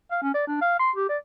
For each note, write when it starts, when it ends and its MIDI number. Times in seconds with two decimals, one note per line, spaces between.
0.11 0.19 77
0.23 0.32 61
0.34 0.45 74
0.47 0.57 62
0.61 0.77 77
0.79 0.91 84
0.96 1.08 67
1.09 1.17 74